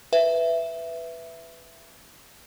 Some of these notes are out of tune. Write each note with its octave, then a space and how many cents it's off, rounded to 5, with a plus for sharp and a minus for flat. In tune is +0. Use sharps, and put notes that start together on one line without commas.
B4 +10 E5 +10